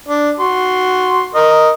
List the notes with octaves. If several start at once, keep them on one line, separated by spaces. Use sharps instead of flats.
D4
F#4 C6
A#4 D#5